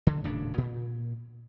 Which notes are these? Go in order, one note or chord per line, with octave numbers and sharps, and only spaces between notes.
D3
D#1 A2 C#3 D4
A#2